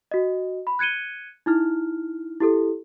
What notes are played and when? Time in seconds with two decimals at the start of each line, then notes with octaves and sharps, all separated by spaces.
0.11 F#4 D#5
0.67 B5
0.79 F#6 G#6 C#7 D#7 G7
1.46 D#4 E4 F6
2.40 E4 G4 A4